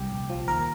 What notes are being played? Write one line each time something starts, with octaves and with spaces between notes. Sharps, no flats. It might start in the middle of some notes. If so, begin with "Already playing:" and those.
Already playing: C2 G4
A#1
F3
D#2 A#4